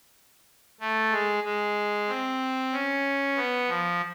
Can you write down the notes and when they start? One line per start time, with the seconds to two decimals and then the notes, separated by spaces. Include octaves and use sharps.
0.80 A3
1.12 G#3
1.44 G#3
2.08 C4
2.72 C#4
3.36 B3
3.68 F3